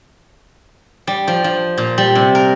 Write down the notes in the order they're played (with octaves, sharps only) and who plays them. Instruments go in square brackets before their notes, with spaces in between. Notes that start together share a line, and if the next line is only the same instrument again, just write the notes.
[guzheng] G3
F3
F3
A#2
G3
C3
A#4